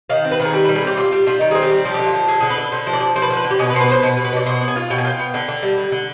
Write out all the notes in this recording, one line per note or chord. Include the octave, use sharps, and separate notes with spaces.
D#3 F5
C4
B4
D#3
G#4
G3 B4
B4
G3
G#4
C4 G4
F4 G4
G3
G3 F4
D#3
C4 G#4
G4
G3
F3
D3 G4
F4
F3
D3 G#4
D3 G#4
B4
D3
D3 C5
F3
D5
F3
F3 C5
B4
D3 C5
B4
D3
G4
B2 G#4
B4
B2 C5
B4
B3 C5
B2 B4
B2
B4
B2 D5
B2 C5
B3
G#5
F4
B2 G5
G#5
F4 G5
B3
D3
D3
G3
D3
D3